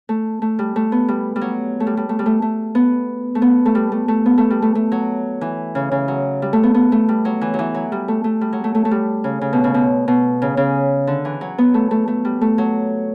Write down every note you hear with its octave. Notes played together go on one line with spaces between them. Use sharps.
A3
A3
G3
A3
B3
G3
G3
F#3
A3
G3
G3
A3
G3
A3
A3
B3
A3
B3
A3
G3
A3
A3
B3
A3
G3
A3
A3
F#3
E3
C#3
C#3
F#3
G3
A3
B3
B3
A3
G3
F#3
E3
F#3
E3
F#3
G3
A3
A3
G3
F#3
A3
A3
A3
G3
C#3
C#3
B2
C#3
B2
B2
C#3
C#3
D3
E3
F#3
B3
A3
A3
A3
G3
A3
F#3